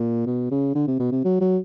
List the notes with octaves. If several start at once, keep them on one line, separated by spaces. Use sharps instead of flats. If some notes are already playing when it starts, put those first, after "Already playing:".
Already playing: A#2
B2
C#3
D3
C3
B2
C3
F#3
F#3